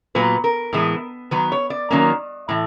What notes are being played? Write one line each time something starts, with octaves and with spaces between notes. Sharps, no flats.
A#2 F#3 B3 B4
A#4
A2 E3 G#3 B3
D#3 F#3 B3 B4
C#5
D5
D#3 F#3 A#3 C#4
A2 E3